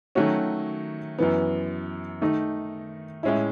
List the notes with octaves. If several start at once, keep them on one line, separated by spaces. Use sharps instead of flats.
D#3 F#3 A3 C#4 F#4
F#2 E3 B3
D#3 A3 D#4
A2 G#3 C#4 E4